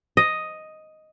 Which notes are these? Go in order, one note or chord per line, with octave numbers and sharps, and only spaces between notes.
D#5